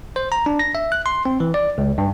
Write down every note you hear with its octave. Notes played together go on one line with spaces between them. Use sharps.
C5
A#5
D4
A#6
E5
F#6
C6
C4
E3
D5
C#2
G2